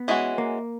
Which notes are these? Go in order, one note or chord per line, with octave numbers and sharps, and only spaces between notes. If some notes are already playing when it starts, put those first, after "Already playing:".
Already playing: B3
E3 G#3 C#4 F#4
A#3